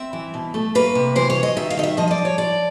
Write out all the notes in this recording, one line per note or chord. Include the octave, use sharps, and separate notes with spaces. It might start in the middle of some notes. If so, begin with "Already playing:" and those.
Already playing: C4 E5
E3
B2
A3
A#3 B4
C3
E3 C5
C#5
C#4
D#5
D#3 E5
F5
D#3 D#5
E5
F3 D#5
D#5
D5
F3
C#5
E4 D5